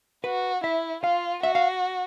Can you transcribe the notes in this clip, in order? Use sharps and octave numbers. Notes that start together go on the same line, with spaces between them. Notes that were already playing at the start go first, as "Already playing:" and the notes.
F#4 B4
E4 E5
F4 F5
F#4 E5
F5